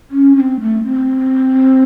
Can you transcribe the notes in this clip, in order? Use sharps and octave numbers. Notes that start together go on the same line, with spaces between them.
C#4
C#4
C4
A3
C4